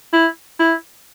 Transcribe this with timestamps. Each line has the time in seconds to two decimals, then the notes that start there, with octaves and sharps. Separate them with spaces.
0.13 E4
0.60 E4